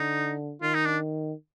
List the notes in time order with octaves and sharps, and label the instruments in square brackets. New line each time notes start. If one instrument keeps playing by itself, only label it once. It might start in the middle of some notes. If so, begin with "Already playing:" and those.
Already playing: [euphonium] D3 [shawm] D#4
[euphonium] D#3 [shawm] F4
[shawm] D#4
D4